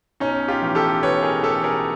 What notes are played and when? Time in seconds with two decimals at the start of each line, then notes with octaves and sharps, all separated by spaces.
0.20 B1 C#4 D#4
0.48 F4 G4
0.62 A2 E3
0.75 G4 A4
1.03 B1 B4 C#5
1.23 G#4 A#4
1.43 A2 E3 G4 A4
1.64 G#4 A#4